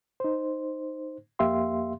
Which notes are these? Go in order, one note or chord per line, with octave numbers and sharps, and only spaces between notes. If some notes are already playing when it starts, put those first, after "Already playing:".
D#4 C5
F2 A#3 G4 E5 F5 C6